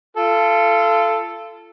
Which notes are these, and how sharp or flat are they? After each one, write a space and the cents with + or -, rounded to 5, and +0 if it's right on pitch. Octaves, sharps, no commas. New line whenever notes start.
F4 -30 A4 +0